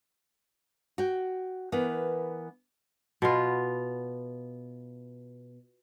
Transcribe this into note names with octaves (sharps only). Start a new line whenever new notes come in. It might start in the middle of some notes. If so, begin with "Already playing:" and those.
F#4 G5
E3 B3 A#4
B2 B3 F4